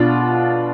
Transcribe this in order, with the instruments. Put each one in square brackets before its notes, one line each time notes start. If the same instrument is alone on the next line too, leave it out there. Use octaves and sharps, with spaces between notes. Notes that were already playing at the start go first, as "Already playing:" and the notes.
Already playing: [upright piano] B2 D4 F4